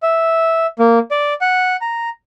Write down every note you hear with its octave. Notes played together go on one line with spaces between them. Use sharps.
E5
A#3
D5
F#5
A#5